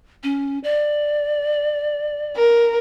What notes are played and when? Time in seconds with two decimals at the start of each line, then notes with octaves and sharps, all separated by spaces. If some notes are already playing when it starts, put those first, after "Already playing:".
0.23 C#4
0.64 D5
2.37 A#4